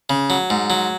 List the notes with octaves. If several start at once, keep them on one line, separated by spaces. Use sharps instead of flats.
C#3
F#3
G#2
F#3